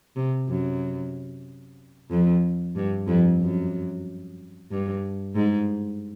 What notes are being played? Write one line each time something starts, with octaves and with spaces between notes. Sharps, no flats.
C3
F#2
F2
G2
F2
F#2
G2
G#2